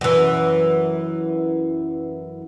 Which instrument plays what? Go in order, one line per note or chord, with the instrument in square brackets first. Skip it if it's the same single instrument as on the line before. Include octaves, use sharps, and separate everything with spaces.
[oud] F#2 E3